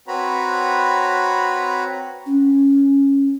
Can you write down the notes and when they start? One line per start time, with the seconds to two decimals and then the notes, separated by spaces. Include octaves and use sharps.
0.08 C4 F#4 B4 C#5 A#5 B5
2.26 C#4